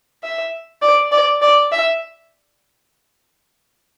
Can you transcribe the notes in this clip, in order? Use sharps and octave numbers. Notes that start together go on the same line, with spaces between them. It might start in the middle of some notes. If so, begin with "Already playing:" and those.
E5
D5
D5
D5
E5